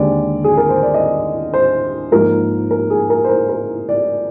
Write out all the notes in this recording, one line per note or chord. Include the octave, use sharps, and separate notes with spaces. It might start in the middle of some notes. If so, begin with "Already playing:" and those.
Already playing: D#2 D3 G#3 C4 D5
G#4
A#4
C5
D5
D#5
C5
G#2 F3 A#3 A#4
A#4
G#4
A#4
C5
A#4
A#4
D5